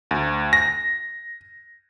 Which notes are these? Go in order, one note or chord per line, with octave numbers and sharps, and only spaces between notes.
D2
A#6